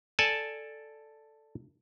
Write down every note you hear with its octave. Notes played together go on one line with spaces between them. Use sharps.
A4 D5 G#5 A5